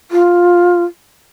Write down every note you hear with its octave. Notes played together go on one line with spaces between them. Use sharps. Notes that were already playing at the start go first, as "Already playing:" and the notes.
F4